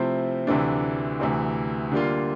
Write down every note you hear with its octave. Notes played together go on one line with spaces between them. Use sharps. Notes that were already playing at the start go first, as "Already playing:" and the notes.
Already playing: C3 F3 A3 C4 E4
D2 C3 E3 A3 D4
D2 C3 E3
D3 G3 A#3 F4